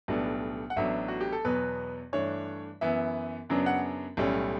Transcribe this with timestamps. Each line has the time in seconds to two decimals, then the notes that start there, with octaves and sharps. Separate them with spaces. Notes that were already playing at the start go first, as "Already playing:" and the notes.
0.08 B1 A2 G3 B3 D4
0.70 F#5
0.76 A1 A2 F#3 B3 D4 E5
1.08 F#4
1.21 G4
1.32 A4
1.45 E2 B2 F#3 B3 B4
2.13 G2 E3 A3 D4 C#5
2.81 F#2 E3 B3 E5
3.49 F#2 C#3 F#3 B3 D4
3.66 F#5
4.17 B1 A2 G3 C#4